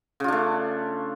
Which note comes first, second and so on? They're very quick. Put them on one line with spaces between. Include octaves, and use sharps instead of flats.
C#3 F4 D4 A3